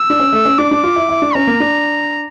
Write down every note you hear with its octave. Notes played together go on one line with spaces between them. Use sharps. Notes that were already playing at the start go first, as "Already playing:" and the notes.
Already playing: E6
D4
C#4
A3
C#4
D4 D6
D4
F4
E4
E4
D4
C#4 A#5
A#3
D4